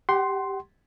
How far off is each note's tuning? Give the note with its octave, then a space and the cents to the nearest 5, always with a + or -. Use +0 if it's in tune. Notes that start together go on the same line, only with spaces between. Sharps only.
G4 +0 F#5 +35 C6 +0